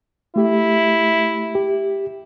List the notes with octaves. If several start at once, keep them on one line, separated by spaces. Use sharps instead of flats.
A3 E4 G4
G4